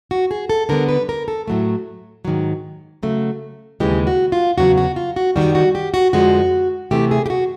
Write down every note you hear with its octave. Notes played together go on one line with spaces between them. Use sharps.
F#4
G#4
A4
D3 G3 B3 A#4
B4
A#4
A4
A2 F#3 A3
G#2 D#3 F#3
C#3 F#3 A3
D#2 C#3 E3 G#3 G4
F#4
F4
E2 C#3 F#3 F#4
F#4
F4
F#4
F#2 D#3 G3 F#4
F#4
G4
F#4
F2 D3 F3 G#3 F#4
C3 E3 A3 G4
G#4
G4
F#4